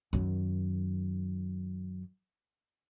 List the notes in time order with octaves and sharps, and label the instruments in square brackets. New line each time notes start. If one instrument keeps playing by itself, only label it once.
[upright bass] F#2 D#3